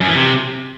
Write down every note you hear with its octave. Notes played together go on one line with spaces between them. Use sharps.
F#2
E3
C3